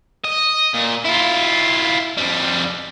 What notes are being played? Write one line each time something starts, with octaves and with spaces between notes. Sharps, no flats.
D#5
A#2
E4 F4
F2 G3